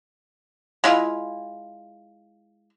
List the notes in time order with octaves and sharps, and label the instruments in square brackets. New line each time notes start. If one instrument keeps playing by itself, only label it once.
[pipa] G#3 E4 F4